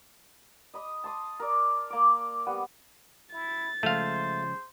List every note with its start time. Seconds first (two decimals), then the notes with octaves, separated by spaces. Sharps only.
0.74 D#5 B5 D#6
1.04 A5 C6 D#6
1.40 A#4 D5
1.90 A#3 D6
2.46 G3 B3 F#5
3.33 E4 A6
3.83 C#3 F3 G#3 A3 C5 F5